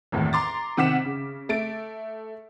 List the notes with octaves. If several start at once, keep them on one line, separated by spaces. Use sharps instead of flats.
G#1 E2 A2
A#5 C6 D6 A6
C3 D#3 F#5 D6 B6 E7
C#3
A3 A6 D7